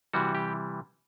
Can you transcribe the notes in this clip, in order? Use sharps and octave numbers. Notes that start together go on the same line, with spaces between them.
C3 E3 G3 F#4
G4